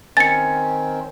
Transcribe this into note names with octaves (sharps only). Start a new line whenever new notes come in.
D#3 C4 C#4 A6 C#7